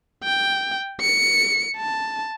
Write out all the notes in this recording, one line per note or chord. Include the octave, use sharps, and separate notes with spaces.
G5
C#7
A5